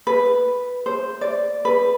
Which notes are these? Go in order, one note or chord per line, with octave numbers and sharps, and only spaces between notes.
B4
C5
D5
B4